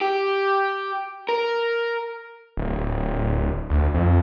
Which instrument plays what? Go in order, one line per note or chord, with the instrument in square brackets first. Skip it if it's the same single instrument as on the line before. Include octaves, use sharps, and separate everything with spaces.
[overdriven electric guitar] G4
A#4
[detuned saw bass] D1
D2
F2